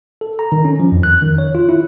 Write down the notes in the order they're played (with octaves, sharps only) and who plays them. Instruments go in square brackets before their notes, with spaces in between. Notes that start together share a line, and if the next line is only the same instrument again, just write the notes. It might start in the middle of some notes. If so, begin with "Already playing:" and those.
[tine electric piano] A4
A#5
D#3
C#4
F3
F2
F#6
D#3
C#5
F4
E4